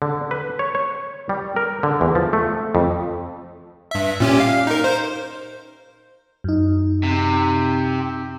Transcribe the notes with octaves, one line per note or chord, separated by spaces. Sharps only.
D3
B4
C#5
C#5
G3
A#4
D3
E2
F3
A3
F2
G2 E5
A#2 C#4 G4
F5
D#4 A#4
C5
F#2 D#4
C3